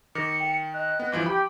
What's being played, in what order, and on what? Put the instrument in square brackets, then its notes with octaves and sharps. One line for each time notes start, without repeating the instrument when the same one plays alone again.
[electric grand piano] D#3 [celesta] D6 A#6 [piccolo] C#7
[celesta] G5
[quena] D#5 [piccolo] F#6
[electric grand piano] B3
[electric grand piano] G1 E3 F3 [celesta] D6 F#7
[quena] G4 [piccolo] G5 [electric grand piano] B5